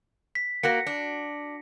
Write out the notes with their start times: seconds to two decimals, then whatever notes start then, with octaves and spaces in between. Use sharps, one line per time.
0.35 B6
0.63 A#3 F#4 A#4 A#6 C#7
0.86 D4